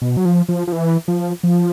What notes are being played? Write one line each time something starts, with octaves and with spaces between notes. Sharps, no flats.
B2
F#3
F3
F3
F3
E3
F3
F3